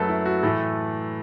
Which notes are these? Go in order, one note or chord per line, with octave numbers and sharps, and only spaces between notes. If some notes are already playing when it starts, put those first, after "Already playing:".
Already playing: F#2 F#3 A3 A4 B4
E4
F#4
A2 E3 A3 A4